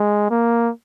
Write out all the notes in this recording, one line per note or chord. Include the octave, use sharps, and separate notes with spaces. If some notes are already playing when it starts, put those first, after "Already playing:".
Already playing: G#3
A#3